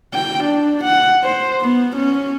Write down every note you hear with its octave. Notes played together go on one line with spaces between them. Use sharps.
G5
D4
F#5
C5
B3
C#4